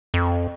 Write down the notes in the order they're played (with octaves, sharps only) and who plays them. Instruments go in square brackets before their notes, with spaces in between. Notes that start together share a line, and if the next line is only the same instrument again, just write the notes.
[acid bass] F2